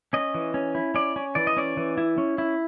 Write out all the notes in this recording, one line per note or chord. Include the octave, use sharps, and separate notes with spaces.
C#4 D#5
E3
C#4
E4
C#4 D5
C#4
E3 D5
D#5
C#4 D5
E3
E4
C#4
E4